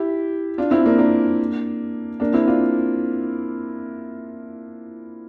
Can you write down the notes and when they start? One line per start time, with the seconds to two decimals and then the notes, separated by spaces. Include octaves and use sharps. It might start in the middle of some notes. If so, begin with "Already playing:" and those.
Already playing: E4 G4
0.58 D4 F4
0.71 C4 E4
0.85 A#3 D4
0.98 A#3 D4
2.20 A#3 D4
2.33 C4 E4
2.47 D4 F4